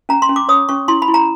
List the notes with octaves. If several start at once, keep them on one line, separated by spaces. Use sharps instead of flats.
C#4 A#5
C6
C#4
D6
C#5 D#6
C#4 C#6
E4 C6
B5
E4
A#5